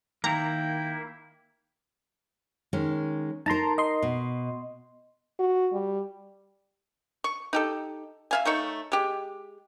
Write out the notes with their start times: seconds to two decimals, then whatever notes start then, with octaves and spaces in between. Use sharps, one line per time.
0.24 D#3 A#3 E4 G5 A#5
2.73 D#3 G#3 C#4
3.46 D#4 A#4 A5 A#5 C6
3.78 D#5 C6
4.02 B2
5.39 F#4
5.73 G3
7.24 C#6
7.53 D#4 G4 A4
8.31 E5 F5 G#5
8.45 A3 D#4 C#5 E5
8.92 G#3 G4